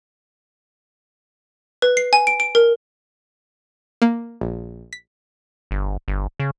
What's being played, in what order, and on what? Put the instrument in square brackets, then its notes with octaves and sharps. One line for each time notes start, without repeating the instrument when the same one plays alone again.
[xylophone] B4
C7
G#5
D7
D7
A#4
[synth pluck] A#3
A#1
B6
[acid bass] G1
G1
C#3